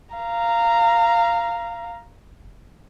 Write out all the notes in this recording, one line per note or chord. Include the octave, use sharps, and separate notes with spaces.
F5 A#5